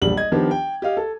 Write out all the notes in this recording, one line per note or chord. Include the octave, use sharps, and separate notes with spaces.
E1 A#1 G3 F#7
D#5 G#6
D#3 F3 B3 D4 G4
G5
G4 D#5 F5
A4